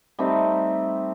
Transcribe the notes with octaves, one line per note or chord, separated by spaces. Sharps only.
G3 A3 C4 D#4